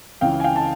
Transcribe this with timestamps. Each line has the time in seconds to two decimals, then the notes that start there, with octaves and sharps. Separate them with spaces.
0.21 C#2 C#3 E3 F5 G5
0.40 G#5
0.44 F5 G5
0.56 A5